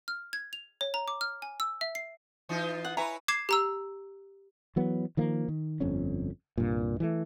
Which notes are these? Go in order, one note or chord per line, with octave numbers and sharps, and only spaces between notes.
F6
G#6
F7
C#5
A#5
D6
F6
G#5
E6
E5
C7
E3 D#4 F4
F#5
E4 B4 C#5 E5 G#5 A#5
D6 G#6 C7 E7
G4 A#5 E6
E3 F#3 B3
D#3 F3 A#3
D#3
G1 F2 C#4
C2 G2 A#2
E3 G3 A3